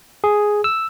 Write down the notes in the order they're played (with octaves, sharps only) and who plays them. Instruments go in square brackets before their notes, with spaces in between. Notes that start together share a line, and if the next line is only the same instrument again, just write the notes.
[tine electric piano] G#4
E6